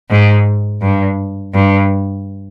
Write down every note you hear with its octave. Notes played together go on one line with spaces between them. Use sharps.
G#2
G2
G2